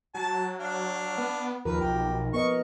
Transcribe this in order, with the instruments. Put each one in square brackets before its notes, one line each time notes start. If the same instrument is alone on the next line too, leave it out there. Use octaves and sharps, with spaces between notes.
[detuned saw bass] F#3 [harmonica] A5
[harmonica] D4 F5
[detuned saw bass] B3
[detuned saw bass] D#2 [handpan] F3 A#4 [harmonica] B4
[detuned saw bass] B1 [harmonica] G4
[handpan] B3 A#4 D#5 [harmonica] C#6